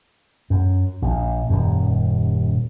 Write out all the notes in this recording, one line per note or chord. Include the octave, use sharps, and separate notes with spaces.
F#2
A#1
D#1 F#2